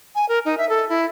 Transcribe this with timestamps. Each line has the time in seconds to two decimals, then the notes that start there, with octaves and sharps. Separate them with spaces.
0.15 G#5
0.29 A#4
0.45 D#4
0.58 E5
0.69 A4
0.89 E4